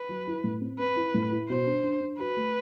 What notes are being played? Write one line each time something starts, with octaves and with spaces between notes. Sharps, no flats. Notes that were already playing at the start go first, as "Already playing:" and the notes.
Already playing: B4
F#3
E4
A2
C4
C4 B4
E4
A2
E4
B2 C5
D4
D4
D4
F#4 B4
A3